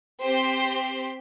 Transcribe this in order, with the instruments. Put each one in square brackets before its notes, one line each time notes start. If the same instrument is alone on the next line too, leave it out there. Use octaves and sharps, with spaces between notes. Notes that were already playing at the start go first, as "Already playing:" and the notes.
[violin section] C4 G4 C5 C6